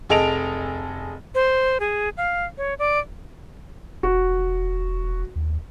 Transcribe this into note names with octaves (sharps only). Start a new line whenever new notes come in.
F1 G#4 A4 D#5 D7 F7
C5
G#4
F5
C#5
D5
E1 F#4
D#2